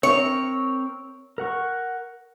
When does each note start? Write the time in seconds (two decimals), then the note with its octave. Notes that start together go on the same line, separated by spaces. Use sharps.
0.03 C4 A#4 C#5
1.38 A#4 F#5 C#6